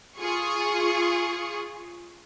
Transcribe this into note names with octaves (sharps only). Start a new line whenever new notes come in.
F4 G#4 C#6 D#6